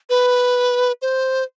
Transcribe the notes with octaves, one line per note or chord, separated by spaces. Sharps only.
B4
C5